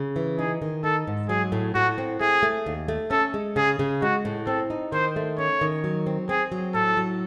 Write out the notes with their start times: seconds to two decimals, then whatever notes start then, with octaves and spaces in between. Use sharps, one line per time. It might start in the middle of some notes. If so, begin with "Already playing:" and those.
Already playing: C#3
0.16 E3
0.39 D#4 G#4
0.62 D#3
0.84 D#4 A4
1.07 G#2
1.29 F#3 G#4
1.52 A2
1.75 A2 F#4
1.98 C4
2.21 A3 G#4
2.43 A3
2.66 D#2
2.88 A3
3.11 C#4 A4
3.34 G#3
3.56 C#3 G#4
3.79 C#3
4.02 G#3 F#4
4.25 A2
4.47 C4 A4
4.70 D#4
4.92 D#3 C5
5.16 A3
5.38 C#4 C#5
5.61 D#3
5.84 F#3
6.06 C4
6.29 C4 G#4
6.52 F#3
6.74 A2 A4
6.97 F#3